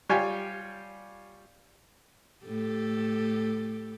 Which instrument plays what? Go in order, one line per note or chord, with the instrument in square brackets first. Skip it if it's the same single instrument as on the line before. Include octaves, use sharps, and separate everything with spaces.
[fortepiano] G3 F4 C#5 G5 G#5
[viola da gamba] A2 G4 A4